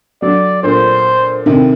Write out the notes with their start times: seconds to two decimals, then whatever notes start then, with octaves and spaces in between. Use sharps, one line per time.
0.22 D3 F#3 D5
0.63 A#2 D3 C5
1.46 C3 D#3